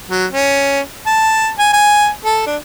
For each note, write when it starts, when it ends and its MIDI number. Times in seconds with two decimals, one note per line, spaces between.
0.10 0.26 54
0.32 0.80 61
1.06 1.49 81
1.59 1.69 80
1.73 2.08 80
2.25 2.41 69
2.46 2.56 62